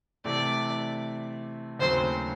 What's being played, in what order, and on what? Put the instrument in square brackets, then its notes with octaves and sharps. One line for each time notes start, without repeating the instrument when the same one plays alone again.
[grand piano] C3 E3 A3 [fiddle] D5
[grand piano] D#2 C#3 F#3 A3 C4 [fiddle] C5